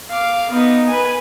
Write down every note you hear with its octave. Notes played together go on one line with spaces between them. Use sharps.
F5 D6
B3 D#4
B4 G#5